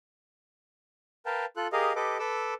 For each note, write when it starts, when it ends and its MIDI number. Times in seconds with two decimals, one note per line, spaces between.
1.26 1.45 70
1.26 1.45 71
1.26 1.45 77
1.26 1.45 79
1.26 1.45 81
1.57 1.67 65
1.57 1.67 69
1.57 1.67 90
1.73 1.93 67
1.73 1.93 68
1.73 1.93 70
1.73 1.93 75
1.73 1.93 77
1.96 2.18 67
1.96 2.18 69
1.96 2.18 71
1.96 2.18 75
1.96 2.18 86
2.19 2.54 69
2.19 2.54 71
2.19 2.54 86
2.19 2.54 88